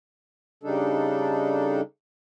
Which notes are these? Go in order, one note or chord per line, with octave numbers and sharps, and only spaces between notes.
C#3 G3 D4 D#4 A4